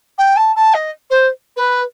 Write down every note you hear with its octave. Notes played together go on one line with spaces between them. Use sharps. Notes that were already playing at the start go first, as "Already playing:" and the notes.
G5
A5
A5
D#5
C5
B4